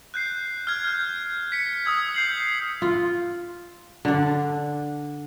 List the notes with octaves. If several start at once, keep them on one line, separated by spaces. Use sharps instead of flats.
F#6 G6 C7
F6 G#6
F6 G6
B6 C#7
D#6 E6 G#6
G6 C7 F#7
F4
D3 D4